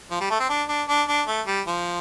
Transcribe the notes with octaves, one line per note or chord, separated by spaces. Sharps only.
F3
G3
A3
C4
D4
D4
D4
D4
A3
G3
F3